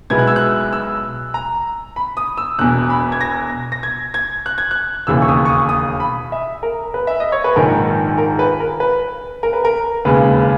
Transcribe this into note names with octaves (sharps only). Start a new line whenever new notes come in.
B1 B2 G#3 B3 E4 G#6
F#6
E6
F#6
E6
A#5
B5
D#6
E6
E1 E2 B2 F#6
B5
G#6
A#6
A#6
G#6
G#6
F#6
G#6
F#6
E1 D#2 C#3 E3 E6
C#6
D#6
C#6
D#6
D#6
B5
E5
A#4
B4
E5
D#5
C#5
B4
A#1 G#2 D#3 A#4
A#4
B4
A#4
B4
A#4
B4
A#4
E1 D#2 C#3 G#3 B4